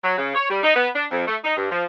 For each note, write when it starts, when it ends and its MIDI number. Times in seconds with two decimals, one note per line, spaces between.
0.04 0.17 54
0.18 0.33 49
0.35 0.47 73
0.50 0.59 55
0.63 0.72 63
0.75 0.88 59
0.95 1.05 62
1.11 1.25 41
1.27 1.37 57
1.44 1.54 63
1.57 1.67 43
1.71 1.85 53